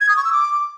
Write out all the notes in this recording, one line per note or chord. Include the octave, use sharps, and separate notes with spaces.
G#6
D#6
C#6
E6
D6